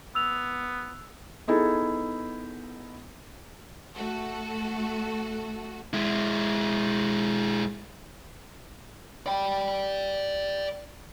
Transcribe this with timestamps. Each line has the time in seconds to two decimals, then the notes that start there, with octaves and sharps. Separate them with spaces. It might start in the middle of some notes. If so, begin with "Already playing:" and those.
0.15 B3 E6 F7
1.48 B3 D#4 E4 G#4 A4
3.94 A3 F#4 A4
5.93 G#3 E4
9.26 D5 G5